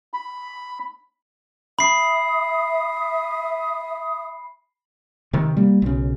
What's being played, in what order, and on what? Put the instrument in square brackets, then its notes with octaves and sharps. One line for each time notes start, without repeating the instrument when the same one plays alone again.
[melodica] B5
[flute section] E5 D#6 [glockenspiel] B5 C7
[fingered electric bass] C3 D#3
G3 A#3
B1 C#3